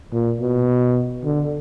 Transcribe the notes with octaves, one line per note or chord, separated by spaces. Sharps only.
A#2
B2
D3